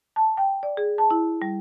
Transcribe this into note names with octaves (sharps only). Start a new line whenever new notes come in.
A5
G5
D5
G#4
A5
E4
G3